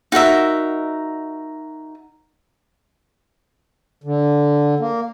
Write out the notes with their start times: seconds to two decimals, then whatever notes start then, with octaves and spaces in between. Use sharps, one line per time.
0.12 D#4 F#4 A#4 E5
4.04 D3
4.80 A#3